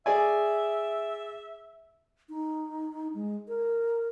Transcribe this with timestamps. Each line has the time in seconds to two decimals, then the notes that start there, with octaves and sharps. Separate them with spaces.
0.06 G#4 D5 E5 G#5
2.29 D#4
3.14 G#3
3.48 A#4